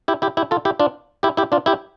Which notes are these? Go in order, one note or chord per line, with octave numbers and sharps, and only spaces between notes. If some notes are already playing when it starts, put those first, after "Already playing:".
E4 G4
E4 G4
E4 G4
F4 A4
E4 G4
D4 F4
E4 G4
E4 G4
D4 F4
E4 G4